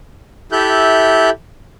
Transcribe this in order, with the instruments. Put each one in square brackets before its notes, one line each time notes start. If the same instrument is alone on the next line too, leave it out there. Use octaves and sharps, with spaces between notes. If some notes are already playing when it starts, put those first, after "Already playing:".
[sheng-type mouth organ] E4 G4 A4 E5 F#6 G6